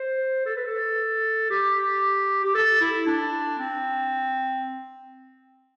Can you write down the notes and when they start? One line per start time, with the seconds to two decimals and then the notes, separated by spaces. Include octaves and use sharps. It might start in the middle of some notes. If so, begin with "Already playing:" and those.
Already playing: C5
0.45 A4
0.56 B4
0.66 A4
1.50 G4
2.44 G4
2.55 A4
2.81 E4
3.07 D4
3.59 C4